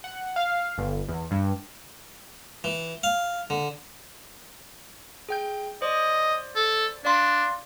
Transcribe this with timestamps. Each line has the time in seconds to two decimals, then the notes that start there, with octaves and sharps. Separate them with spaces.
0.04 F#5
0.36 F5
0.78 G1
1.09 E2
1.31 G2
2.64 E3
3.03 F5
3.50 D3
5.29 G#4 G5 G6
5.82 C5 D5 D#5
6.56 A4
7.05 D4 D5 F5 C6